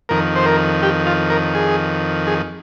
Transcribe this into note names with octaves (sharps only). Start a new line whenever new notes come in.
F2 D#3 A#4
C5
A#4
G4
F4
A#4
G#4
G#4